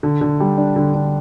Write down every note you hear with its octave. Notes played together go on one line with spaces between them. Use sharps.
D3
D3
G3
D4
D3
D3